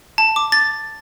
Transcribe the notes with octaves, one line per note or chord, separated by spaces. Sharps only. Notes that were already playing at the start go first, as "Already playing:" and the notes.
A5
D6
A6